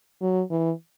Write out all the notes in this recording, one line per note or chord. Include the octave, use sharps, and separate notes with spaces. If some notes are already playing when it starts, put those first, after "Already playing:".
F#3
E3